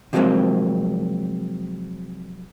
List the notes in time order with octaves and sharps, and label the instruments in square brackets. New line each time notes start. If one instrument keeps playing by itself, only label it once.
[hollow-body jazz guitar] C3 F3 F#3 G#3 A#3 C4